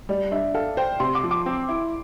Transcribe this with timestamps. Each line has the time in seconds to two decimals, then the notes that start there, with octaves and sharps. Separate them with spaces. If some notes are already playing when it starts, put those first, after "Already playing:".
0.09 G3 D5
0.32 D4 E5
0.54 A4 F5
0.77 C5 G5
1.00 C3 C6
1.15 D6
1.23 F3
1.31 D6
1.46 C4
1.69 E4